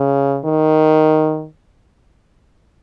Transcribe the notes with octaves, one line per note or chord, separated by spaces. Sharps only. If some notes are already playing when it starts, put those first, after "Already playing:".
Already playing: C#3
D#3